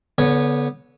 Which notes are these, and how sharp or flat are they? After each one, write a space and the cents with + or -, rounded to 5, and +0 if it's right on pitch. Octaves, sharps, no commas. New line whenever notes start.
D3 -30 B3 -15 C#5 +0